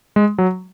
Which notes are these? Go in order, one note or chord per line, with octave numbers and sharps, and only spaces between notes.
G#3
F#3